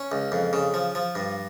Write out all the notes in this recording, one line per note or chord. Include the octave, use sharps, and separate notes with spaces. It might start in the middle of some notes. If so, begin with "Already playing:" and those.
Already playing: C#4
C#2
F2
C#3
F3
F3
G2